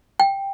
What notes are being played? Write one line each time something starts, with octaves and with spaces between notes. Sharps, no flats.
G5